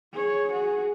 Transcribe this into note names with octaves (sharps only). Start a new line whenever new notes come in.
G#4 C#5
F#4 G#4